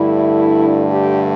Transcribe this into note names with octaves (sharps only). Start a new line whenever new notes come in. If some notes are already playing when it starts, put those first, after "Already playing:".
Already playing: G2 D3 A3 E4
G4